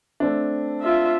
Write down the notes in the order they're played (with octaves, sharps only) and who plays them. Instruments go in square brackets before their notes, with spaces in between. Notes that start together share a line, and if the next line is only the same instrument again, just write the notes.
[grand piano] A3 C4 D4
[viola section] F4 E5